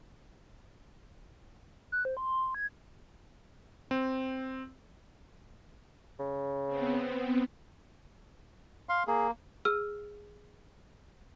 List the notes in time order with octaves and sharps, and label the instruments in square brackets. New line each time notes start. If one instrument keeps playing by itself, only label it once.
[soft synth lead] F#6
C5
C6
G#6
[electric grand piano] C4
[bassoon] C#3
[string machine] B3 C4
[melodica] F5 C6
[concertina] A#3 [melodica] G#4
[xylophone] G#4 E6 F6